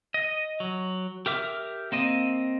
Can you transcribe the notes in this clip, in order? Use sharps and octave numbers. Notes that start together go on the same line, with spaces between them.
D#5
F#3
G4 A#4 E5 D6 F6
A#3 C4 D#5